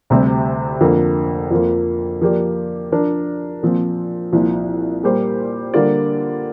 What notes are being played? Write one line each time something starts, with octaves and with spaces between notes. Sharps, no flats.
D2 C3 G3 C4
F2 D3 A#3
F2 F3 A#3
F3 A#3 G4 D5
F3 D4 A#4 D5
A#2 F3 C4
C2 A#2 F3
A#2 G3 A#3 G4 C5
D3 G3 A#3 F4 D5